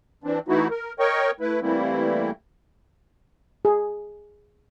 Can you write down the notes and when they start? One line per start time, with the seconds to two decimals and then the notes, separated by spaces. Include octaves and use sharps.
0.24 E3 C4 D4
0.48 E3 A3 D#4 E4 F#4
0.70 A#4
0.99 A#4 C#5 D#5 G5 C#6
1.40 A3 E4 B4
1.62 E3 G3 A3 A#3 C4 E4
3.65 G#4